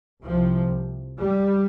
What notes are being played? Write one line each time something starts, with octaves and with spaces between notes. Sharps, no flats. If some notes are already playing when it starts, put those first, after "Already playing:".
C2 C3 F3
G3